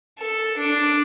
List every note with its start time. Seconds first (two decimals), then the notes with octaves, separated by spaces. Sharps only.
0.18 A4
0.58 D4